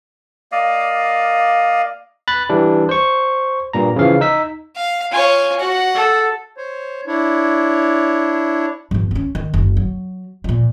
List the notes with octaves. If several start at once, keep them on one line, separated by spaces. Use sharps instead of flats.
A#3 D5 D#5 F5
B5 F#6 A6
E3 G3 D4
C5 C#6
G2 A#2 A#5
C#3 E3 F3 F5
D#4 E6 B6
F5
F4 C#5 G#5
F#4 F#5
A4
C5 C#5
D4 E4 C#5
G2 F3
B3 C#4
D#3
F#1
F#3
A#2 F3